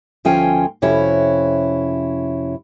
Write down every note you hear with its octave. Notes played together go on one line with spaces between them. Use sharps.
D2 F3 C#4 F4 G5 G#5
F2 C3 C#4 E4 F#4 C#5